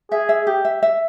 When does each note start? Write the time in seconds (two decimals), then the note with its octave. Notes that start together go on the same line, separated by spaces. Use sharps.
0.12 G#4 E5
0.29 E5
0.47 G4
0.65 E5
0.82 E5